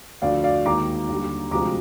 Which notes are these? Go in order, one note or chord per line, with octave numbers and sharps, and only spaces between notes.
D2 D3 F3 D5 F5
D5 F5
D#2 D#3 G#3 A#5 D6
D#2 D3 G3
D2 C3 F3 G#3 A#5 D6